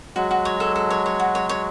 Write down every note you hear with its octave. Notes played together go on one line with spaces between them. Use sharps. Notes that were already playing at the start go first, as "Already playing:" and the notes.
F#3 G#3 F#4
F#4
C#5
A4
A4
C#5
C#5
F#4
C#5
C#5